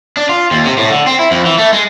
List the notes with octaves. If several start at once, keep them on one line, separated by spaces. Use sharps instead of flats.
D4
F4
D#2
C3
A2
D3
C4
E4
F2
E3
A3
G#3